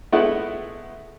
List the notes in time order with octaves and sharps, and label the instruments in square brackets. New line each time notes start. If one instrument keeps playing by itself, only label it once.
[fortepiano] G#3 A3 B3 E4 F#5